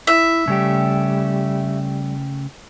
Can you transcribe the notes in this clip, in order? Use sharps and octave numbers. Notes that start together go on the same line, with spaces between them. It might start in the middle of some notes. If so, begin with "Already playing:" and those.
E4 E5
C#3 G3 A3 G4